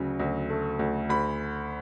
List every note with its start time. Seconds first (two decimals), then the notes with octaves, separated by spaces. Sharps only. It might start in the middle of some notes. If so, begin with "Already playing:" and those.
Already playing: D2 C#3 F#3
0.20 D2
0.50 A3
0.79 D2
1.09 D2 B5